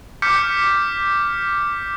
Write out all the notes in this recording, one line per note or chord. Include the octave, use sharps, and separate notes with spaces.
D6 F6 G6 B6 C#7